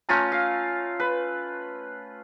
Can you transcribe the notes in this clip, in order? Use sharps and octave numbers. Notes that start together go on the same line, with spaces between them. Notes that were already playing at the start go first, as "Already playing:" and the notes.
A3 C#4 F4 A#5
F5
B4